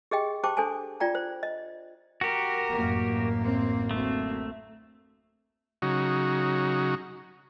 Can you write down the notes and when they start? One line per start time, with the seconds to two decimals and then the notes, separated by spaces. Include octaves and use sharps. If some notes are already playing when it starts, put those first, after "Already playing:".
0.11 G4 G#4 D#5 G5
0.43 G4 C5 G5 A5 D6
0.57 D4 A4 C5 G#5 A5
1.00 F4 D5 G5 A#5
1.15 C5
1.43 D#5
2.21 F#4 G4 A#4
2.72 A1 F#2 A#3
3.42 C4
3.91 D2 A3 C4
5.82 C#3 F#3 D#4 F#4